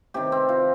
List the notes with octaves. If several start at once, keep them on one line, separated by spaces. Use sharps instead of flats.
C3 D#3 G4
C4
F4